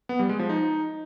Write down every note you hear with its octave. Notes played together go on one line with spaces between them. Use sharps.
B3
G3
G#3
F3
D#4